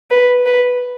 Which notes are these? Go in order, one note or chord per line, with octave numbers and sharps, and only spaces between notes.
B4
B4